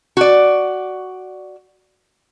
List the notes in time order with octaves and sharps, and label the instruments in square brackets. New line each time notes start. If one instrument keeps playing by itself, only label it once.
[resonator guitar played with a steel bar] F#4 D5